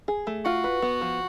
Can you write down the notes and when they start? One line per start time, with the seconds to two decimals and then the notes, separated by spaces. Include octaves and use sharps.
0.08 G#4
0.27 A3
0.45 F4 F#4
0.64 B4
0.82 B3
1.01 F3